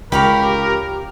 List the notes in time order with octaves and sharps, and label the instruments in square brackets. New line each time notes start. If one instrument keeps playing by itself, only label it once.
[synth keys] C#2 [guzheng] G4 [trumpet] A#4 [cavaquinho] C#5 F5 B5